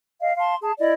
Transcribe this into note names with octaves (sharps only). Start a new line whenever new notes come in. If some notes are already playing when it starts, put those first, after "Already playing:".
D#5 F5
F5 A5 C6
G#4 A5
E4 D5 D#5